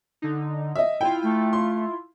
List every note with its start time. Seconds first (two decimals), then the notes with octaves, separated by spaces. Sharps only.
0.22 D3 D#4
0.75 D#5 E5
1.01 E4 F4 G5
1.22 A3
1.53 C6